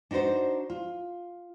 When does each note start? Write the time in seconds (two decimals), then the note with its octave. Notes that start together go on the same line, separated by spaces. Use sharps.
0.11 D4 D#4 F#4 B4 C5
0.70 F4